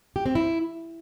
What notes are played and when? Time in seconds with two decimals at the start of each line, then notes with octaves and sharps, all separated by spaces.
0.16 G4
0.26 C4
0.35 E4